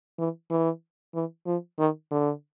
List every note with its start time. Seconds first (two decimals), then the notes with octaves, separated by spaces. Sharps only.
0.19 E3
0.51 E3
1.14 E3
1.46 F3
1.79 D#3
2.11 D3